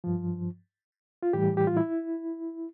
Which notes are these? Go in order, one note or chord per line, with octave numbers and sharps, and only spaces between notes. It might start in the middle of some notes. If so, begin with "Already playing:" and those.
G2 F3
F4
A2 E3 G3 G4
G4
F4
E4